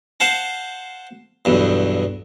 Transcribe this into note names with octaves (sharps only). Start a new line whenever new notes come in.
C5 F5 F#5 A5
B1 E2 G2